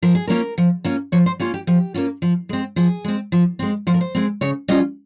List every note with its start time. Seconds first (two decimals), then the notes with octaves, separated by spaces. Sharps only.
0.02 F3 A#4
0.15 G#4
0.27 A#3 C#4 F4 A#4
0.58 F3
0.85 A#3 C#4 F4
1.12 F3 C#5
1.26 C5
1.40 A#3 C#4 F4 G4
1.54 G4
1.67 F3 G4
1.94 A#3 C#4 F4
2.22 F3
2.49 G#3 C4
2.76 F3 G#4
3.04 G#3 C4
3.32 F3
3.59 G#3 C4
3.87 F3 C5
3.94 A#4
4.01 C5
4.15 G#3 C4
4.41 C#3 C#5
4.68 G3 C#4 F4 D#5